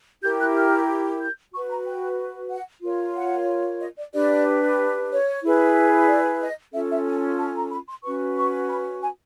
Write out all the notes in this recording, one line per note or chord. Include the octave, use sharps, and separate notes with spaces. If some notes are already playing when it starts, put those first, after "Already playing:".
E4 G4 A#4 G6
F#6
F6
G6
F#4 B4 C#6
A#5
G5
F#5
F4 A#4 C#5
F#5
D#5
D5
D4 G4 B4 D5
C#5
E4 G#4 B4
D5
D#5
C#4 F4 A4 E5
E5
G#5
A5
A#5
B5
C6
C#4 F#4 B4 C#6
C#6
B5
G#5